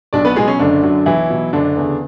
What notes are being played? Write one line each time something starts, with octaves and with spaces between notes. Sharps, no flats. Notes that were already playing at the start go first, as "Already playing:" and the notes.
B1 D4 D5
B3 B4
B2 F#3 G#3 G#4
C#4
F#1 D3 D4
F#2 D3 F#3
B1 E3 E4
B2 F#3
F#1 D3 D4
E2 C#3